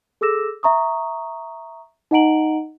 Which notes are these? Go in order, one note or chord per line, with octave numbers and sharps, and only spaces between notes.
G#4 A4 D6 E6 A#6 E7
E5 A#5 C#6 D#6
D#4 D#5 F#5 A#5 D7 F#7